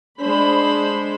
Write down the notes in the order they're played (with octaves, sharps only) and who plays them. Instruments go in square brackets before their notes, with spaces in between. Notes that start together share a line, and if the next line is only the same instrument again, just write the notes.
[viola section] G#3 C5 B5 [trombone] D4